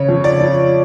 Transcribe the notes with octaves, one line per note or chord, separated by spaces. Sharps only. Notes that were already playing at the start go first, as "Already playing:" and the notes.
Already playing: C#3 C#5
F2
D5
F3